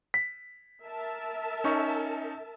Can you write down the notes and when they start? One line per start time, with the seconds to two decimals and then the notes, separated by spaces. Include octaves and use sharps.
0.14 B6
0.83 A#4 E5 A5
1.64 C#4 D#4 C#6